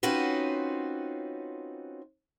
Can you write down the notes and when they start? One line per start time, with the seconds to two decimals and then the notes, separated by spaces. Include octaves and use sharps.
0.03 C4 C#4 D#4 F4 F#4 B4